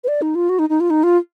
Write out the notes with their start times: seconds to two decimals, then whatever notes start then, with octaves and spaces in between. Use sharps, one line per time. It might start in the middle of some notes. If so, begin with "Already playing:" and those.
0.04 B4
0.08 D5
0.22 D#4
0.35 F4
0.49 F#4
0.59 D#4
0.69 D#4
0.80 F4
0.90 D#4
1.03 F4